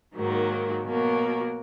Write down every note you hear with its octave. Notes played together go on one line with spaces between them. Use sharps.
G#2 D#3 F#3 A#3
B2 F#3 A#3